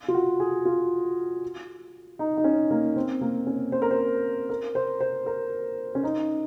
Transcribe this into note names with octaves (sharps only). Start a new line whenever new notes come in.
F4
F#4
G#4
F4
D#4
D#4
C#4
A#3
C4
A#3
C#4
C5
A#4
C5
A#4
C5
C5
A#4
C#4
D#4